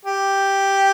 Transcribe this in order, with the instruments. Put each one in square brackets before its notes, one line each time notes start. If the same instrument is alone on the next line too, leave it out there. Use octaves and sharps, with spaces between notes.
[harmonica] G4